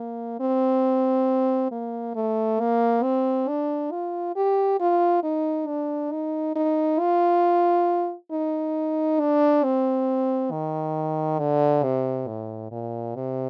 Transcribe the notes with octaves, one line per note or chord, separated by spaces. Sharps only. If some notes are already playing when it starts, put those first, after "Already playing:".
Already playing: A#3
C4
A#3
A3
A#3
C4
D4
F4
G4
F4
D#4
D4
D#4
D#4
F4
D#4
D4
C4
D#3
D3
C3
A2
A#2
C3